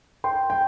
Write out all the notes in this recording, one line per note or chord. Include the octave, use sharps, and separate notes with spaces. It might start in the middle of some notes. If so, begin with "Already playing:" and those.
G5 C6
G5